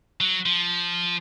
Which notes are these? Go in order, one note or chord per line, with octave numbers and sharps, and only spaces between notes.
F#3
F3